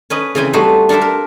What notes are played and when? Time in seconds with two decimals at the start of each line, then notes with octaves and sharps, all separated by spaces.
0.10 C#4 B4 D#5 A#5
0.35 C#3 E3 C4 G5 G#5 B5
0.53 G3 A3 D#4 F#4 B4 C5
0.89 D4 A4 A#4 C5 E5
1.01 A#4